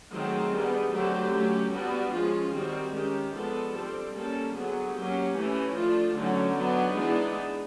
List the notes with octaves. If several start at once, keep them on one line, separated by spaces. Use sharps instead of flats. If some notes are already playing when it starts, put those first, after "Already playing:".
D#3 F#3 A3 C4 G#4
G3 B3 D4
D3 F#3 A3 C4 G4
F#3 A3 C#4
G3 B3 D4 F#4
F3 G#3 C#4 F4
D#3 G3 C4 F#4
D#3 G#3 C#4 G4
F3 G#3 B3 D4 A4
G3 C4 A4
G3 A#3 C#4 A4
D3 F#3 B3 G#4
F#3 A#3 C#4 G4
E3 A3 C#4
F3 A3 D4 F4
D3 F#3 A3 C#4 D#4
F#3 B3 D4
E3 G#3 B3 D4